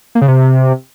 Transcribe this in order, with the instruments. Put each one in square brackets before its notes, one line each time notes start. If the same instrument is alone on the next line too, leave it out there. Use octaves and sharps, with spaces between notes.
[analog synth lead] A#3
C#3
C3